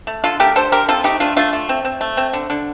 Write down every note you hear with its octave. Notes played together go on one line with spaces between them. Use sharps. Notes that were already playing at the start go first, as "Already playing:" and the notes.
A3
D3 F4 A4
A3 G4 A#4
D3 A4 C5
D3 G4 A#4
C4 F4 A4
A3 D#4 G4
A3 D4 F4
A3 D4 F4
A3
C4
C4
A3
C4
D3
D3